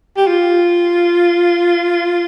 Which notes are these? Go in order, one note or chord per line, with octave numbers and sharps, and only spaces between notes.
G4
F4